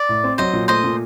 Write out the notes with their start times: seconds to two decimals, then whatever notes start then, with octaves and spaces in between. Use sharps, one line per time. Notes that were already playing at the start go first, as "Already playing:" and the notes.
Already playing: D5
0.09 A2
0.24 C4
0.38 F#3 C5 D#5
0.53 A#2
0.68 A3 C5 D#5
0.84 A#2